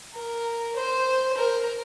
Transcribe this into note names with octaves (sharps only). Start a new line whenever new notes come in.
A#4
C5
A#4